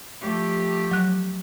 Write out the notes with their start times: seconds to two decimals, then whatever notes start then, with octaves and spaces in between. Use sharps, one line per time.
0.21 F3 A3 G4
0.91 F#3 F#6